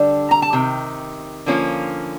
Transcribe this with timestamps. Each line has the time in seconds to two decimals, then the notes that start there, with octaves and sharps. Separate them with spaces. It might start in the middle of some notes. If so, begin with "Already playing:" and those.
Already playing: D3 G3 D4
0.31 A#5
0.42 A5
0.53 C3 D#3
1.46 D3 F3 A#3 C#4 F4